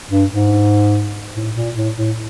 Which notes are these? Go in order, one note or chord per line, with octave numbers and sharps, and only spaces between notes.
G2
G#2
A2
A#2
A2
A2